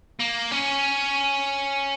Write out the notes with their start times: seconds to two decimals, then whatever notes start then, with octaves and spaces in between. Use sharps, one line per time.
0.20 A#3
0.52 C#4